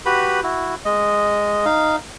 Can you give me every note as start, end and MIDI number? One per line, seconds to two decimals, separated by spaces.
0.06 0.40 66
0.06 0.40 67
0.06 0.40 71
0.06 0.40 83
0.43 0.75 64
0.43 0.75 66
0.85 1.65 56
0.85 1.65 75
1.65 1.96 63
1.65 1.96 77